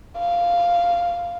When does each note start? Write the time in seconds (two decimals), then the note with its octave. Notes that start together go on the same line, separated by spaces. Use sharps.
0.18 F5